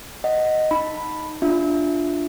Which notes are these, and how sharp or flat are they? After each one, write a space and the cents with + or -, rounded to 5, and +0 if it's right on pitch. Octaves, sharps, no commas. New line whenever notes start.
D#5 +0 F#5 +0
D#4 +0 B5 +0
D4 +0 F4 +0 E5 +0